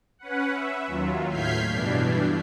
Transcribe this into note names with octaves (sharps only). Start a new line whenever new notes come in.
C#4 B4 F#5
E5
D#2 F#3 F4
A2 F6 G6 G#6 B6 C7
G2 B2 E3 D4